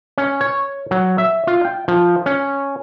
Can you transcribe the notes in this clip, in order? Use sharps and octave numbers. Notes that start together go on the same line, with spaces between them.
C#4
C#5
F#3
E5
F4
G5
F3
C#4